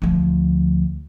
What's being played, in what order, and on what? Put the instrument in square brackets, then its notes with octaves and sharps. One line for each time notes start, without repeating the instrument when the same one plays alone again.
[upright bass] D2 F3